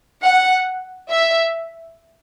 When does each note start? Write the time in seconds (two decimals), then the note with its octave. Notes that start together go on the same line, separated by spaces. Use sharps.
0.21 F#5
1.08 E5